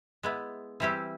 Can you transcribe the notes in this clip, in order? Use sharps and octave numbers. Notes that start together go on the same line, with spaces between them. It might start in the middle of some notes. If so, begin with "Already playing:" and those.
G#3 B3 E4
E3 G3 C4 E4 G4